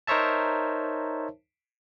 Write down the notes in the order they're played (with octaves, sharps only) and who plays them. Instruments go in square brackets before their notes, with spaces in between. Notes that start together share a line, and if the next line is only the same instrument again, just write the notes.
[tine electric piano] D#4 A#4 C5 C#5 E5 A5